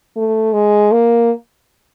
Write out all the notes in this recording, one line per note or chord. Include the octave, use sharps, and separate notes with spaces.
A3
G#3
A#3